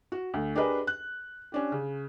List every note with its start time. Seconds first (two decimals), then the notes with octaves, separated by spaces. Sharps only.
0.12 F#4
0.34 D2
0.55 D4 G4 G#4 A#4 B4 D#5
0.87 F#6
1.52 C#4 D4 G4
1.72 C#3